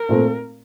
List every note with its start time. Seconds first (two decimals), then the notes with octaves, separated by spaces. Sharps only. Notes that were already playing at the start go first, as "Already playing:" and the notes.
Already playing: A#4
0.09 A#2 A3 C4